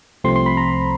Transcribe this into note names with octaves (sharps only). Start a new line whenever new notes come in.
C2 C3 F3 A3 C4 C6
C6
B5
A#5